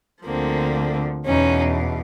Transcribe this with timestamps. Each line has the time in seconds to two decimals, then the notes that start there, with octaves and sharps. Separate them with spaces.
0.24 D2 D3 F3 A#3 C4
1.25 E2 B2 C#4 D#4